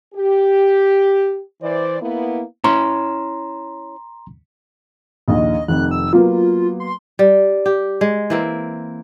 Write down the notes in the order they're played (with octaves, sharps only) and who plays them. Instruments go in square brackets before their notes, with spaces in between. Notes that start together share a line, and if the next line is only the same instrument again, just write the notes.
[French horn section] G4
E3 C5 D5
A#3 B3 E4
[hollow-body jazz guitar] C#4 E4 C#5 [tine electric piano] A#5 C6
[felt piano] A#1 D#2 D#3 [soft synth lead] D#5
[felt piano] F1 F2 D#3 [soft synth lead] F#6
[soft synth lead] E6
[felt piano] F#3 A#3 B3 [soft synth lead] F4
[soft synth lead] C6
[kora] G3
G4
G#3
E3 A#3 C4